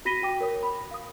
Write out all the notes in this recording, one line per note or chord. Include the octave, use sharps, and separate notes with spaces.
F#4 B5 A#6 B6 D#7 G7
F#4 G5 D6
A#4 C#5 D#6
B5
F5 D#6